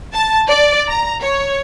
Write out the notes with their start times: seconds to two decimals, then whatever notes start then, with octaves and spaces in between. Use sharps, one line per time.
0.14 A5
0.48 D5
0.89 A#5
1.23 C#5